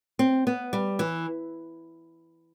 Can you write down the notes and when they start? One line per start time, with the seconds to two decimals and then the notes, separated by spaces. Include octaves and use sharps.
0.19 C4
0.47 B3
0.73 G3
0.99 E3